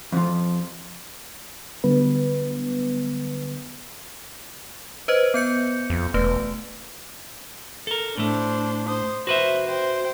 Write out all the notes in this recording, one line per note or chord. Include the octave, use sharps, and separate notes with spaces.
F2 F3
D3 F#3 G3 B3 B4
B4 C5 D#5
B3 G6 C#7
F2
E1 A3 B4
A4 A#4
A2 A3 D4 C5
C5 D#6
F#4 B4 C5 E5
C5 G5